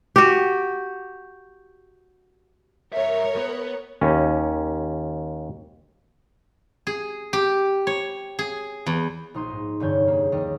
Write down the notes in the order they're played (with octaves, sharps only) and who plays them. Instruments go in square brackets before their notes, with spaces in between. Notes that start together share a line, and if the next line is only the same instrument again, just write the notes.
[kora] F#4 G4
[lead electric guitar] G2 E5 [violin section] A#4 C#5
[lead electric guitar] B3
[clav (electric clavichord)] D#2 C#4
[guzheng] G#4
G4
C#5
G#4
E2
[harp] A#1 D#4 C6 D#7
G#2
F1 G2 D3 C#4 C#5 G6
A#3 G#4
D#2 G3 D#5 A#6